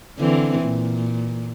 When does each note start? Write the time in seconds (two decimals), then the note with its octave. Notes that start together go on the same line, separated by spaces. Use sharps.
0.19 D3 E3 C4
0.61 A#2